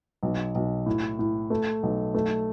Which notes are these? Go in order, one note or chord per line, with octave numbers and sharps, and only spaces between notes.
B1
B1
A2
A2
A3
B1
A3